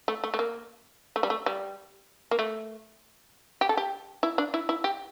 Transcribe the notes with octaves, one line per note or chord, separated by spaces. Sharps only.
A3
A3
A3
A#3
A3
G3
A3
G3
A#3
A3
G4
A4
G4
E4
D4
E4
E4
G4